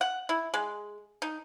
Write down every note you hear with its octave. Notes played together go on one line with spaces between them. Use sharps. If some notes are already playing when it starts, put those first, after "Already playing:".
F#5
E4
G#3
D#4